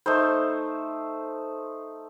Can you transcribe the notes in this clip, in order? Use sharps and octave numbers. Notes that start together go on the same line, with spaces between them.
A3 D#4 C5